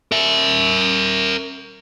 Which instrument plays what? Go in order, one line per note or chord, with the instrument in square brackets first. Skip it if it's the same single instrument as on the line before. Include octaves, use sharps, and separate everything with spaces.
[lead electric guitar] A#4 E5